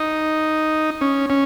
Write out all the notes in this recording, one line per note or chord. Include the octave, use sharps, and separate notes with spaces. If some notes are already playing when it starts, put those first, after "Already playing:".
Already playing: D#4
C#4
C#4